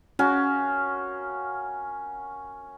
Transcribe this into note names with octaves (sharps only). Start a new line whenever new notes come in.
C#4 F#4 A#4 F5